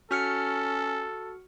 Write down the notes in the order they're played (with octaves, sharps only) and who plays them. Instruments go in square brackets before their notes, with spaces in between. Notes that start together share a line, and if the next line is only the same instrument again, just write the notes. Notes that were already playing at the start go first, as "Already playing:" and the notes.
[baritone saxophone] C#4 [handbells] F#4 F6 C#7 [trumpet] A4